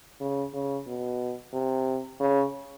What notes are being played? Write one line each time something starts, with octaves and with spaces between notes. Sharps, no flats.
C#3
C#3
B2
C3
C#3